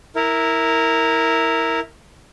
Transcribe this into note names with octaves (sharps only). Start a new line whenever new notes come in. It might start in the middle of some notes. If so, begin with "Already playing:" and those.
E4 A#4